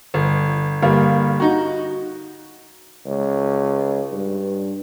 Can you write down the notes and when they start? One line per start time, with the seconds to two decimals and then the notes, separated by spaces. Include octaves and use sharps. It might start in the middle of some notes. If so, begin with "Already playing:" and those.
0.14 G1
0.82 G1 G3 A#3 F5
1.40 D#4 F#4
3.06 C#2
4.12 G2